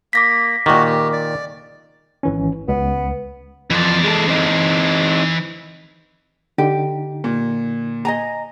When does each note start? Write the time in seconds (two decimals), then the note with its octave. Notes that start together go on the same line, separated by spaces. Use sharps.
0.13 A#3 D6 A#6 B6
0.66 A#2 D#3 F#4 G4
0.85 G4
1.13 D5
2.23 G#1 E3 C#4
2.68 C#2 B3
3.71 F2 E3 F3 D5
4.04 G#3 A4
4.28 C4 D#4
6.58 D3 D#4 G4
7.24 A#2
8.05 D#5 G#5 A#5